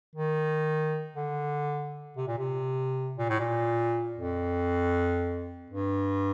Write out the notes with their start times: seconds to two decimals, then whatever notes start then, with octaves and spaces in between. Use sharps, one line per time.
0.15 D#3
1.16 D3
2.17 C3
2.28 A#2
2.38 C3
3.18 A#2
3.29 A2
3.39 A#2
4.19 F2
5.70 G2